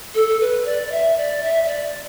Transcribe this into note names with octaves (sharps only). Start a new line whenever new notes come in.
A4
A4
B4
D5
D5
E5
D5
E5
E5
D5